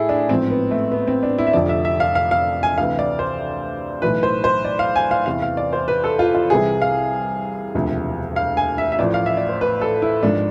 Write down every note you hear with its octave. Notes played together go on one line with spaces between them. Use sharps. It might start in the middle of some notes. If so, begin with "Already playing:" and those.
Already playing: A1 A2 E4 G#4 A4
D4
A1 G#2 F3 C4
B3
A3
B3
C4
D4
E4
E5
F1 F2 D3 F3 D5
E5
E5
F5
F5
F5
G#5
D2 C3 E3 F5
D5
C5
B1 A2 E3 B4
C5
C5
D5
F5
G#5
F5
E2 C3 E3 F5
F5
D5
C5
B4
A4
F4
F4
C2 C3 E3 G#4
F5
E1 D2 C3 F3
F5
G#5
E5
E5
A1 A2 F3 D5
F5
E5
D5
C5
B4
A4
E4
G#1 G#2 F3 D4